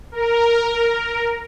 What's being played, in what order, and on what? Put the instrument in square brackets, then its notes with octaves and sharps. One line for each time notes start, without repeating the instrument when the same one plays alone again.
[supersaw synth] A#4